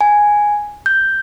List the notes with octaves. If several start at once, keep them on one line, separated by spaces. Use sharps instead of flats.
G#5
G6